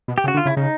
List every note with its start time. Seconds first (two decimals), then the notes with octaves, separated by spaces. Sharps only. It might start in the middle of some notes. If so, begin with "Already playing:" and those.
0.08 B2
0.18 G4
0.24 C#3
0.28 F#4
0.34 D3
0.37 F4
0.46 C#3 E4
0.57 C#3 D#4